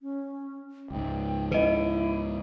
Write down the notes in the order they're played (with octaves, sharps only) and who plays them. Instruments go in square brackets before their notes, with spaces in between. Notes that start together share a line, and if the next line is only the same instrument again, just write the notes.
[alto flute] C#4
[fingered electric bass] C#2 G#2 [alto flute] G5
[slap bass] C#3 [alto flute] E4 [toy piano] B4 D#5